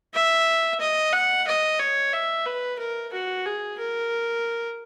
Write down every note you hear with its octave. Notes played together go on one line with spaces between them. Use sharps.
E5
D#5
F#5
D#5
C#5
E5
B4
A#4
F#4
G#4
A#4